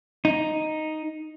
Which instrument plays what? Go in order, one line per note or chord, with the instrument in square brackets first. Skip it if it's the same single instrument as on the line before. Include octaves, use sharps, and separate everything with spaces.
[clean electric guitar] D#4